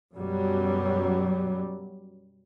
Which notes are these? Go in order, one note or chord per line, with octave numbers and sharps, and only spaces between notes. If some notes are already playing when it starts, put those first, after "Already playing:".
F#2 B2 F#3 G3